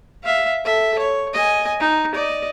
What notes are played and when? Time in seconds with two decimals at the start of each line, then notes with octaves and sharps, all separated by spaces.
0.23 E5 F5
0.65 A4 E5
0.99 C#5
1.34 D#5 G#5
1.80 D#4
2.15 D5 D#5